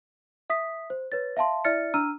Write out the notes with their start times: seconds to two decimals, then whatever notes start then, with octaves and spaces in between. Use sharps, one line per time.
0.50 E5 D#6 B6
0.90 C5
1.12 B4 C#5 A6
1.37 E5 F5 A5 C6
1.65 E4 D5 E5 F6 A6 C#7
1.94 D4 A#5 E6 F6 D#7